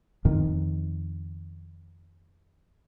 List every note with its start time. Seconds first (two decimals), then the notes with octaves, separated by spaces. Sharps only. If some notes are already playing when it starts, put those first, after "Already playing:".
0.25 F2 D#3